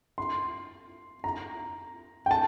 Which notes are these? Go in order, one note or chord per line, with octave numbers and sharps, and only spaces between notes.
C6
A#5
G5
A5